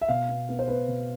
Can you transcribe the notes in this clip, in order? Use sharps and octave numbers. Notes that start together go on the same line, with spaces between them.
E5
B2 F5
B3
B3
C5
B3 B4
B2